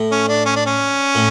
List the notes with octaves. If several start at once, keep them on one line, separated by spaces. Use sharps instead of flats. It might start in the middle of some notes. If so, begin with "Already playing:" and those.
Already playing: A2
C#4
D4
C#4
D4
C#4
A2